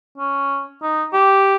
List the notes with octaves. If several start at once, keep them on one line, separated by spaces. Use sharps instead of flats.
C#4
D#4
G4